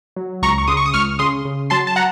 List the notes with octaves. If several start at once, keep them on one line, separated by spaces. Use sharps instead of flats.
F#3
C#2 A#5 C#6
C#6
C#3 C6 D#6
C#6
D#6
C#2 C#6 F6
C#3 C6 D#6
C#3
F#3 A5 C6
A5
F#5 A#5